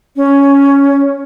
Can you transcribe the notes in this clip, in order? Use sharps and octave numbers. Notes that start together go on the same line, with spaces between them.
C#4